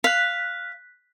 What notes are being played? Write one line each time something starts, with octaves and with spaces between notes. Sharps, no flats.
F5 F#6 B6